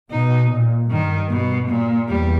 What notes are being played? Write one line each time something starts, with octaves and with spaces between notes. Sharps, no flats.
B2 D#4
A#2
G2 D#3
B2
A#2
E2 G3